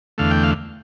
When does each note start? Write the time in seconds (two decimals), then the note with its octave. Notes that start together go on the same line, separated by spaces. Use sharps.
0.18 E2 D3 A3 F5
0.31 G5
0.43 F5